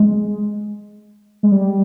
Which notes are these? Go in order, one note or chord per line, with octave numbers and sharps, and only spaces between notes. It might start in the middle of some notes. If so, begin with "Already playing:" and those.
Already playing: G#3
G#3
G3